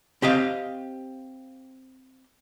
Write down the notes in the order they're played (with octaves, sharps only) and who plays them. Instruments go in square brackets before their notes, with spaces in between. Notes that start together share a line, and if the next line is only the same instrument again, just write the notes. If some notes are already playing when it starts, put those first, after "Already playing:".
[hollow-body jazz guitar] C4 G4 D#5 F5